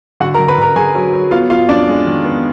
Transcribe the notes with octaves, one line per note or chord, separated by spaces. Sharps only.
D3 F#4 F#5
A#4 A#5
D3
B4 B5
D3 A#4 A#5
D3 G#4 G#5
F#3
F#3
B3 F4 F5
B3 F4 F5
F2 D4 D5
G#3
D#3
B3